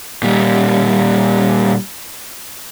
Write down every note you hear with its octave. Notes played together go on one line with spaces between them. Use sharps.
A#2 G3